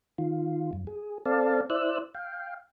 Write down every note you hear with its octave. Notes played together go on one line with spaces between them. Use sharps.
D#3 F4
F#2
G#4
C4 A4 D5 F5 A5
E4 C5 D5 E6 F#6
F5 G5